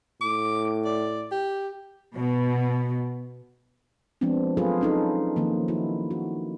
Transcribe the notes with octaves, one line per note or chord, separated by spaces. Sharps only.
A2 D6
D5
G4
B2
F3 G#3 B3 C4 D4
F#3 F4 G#4 A4 B4
C#4 D#4 A4
D#3 F3 A#3
E4 F#4
F#4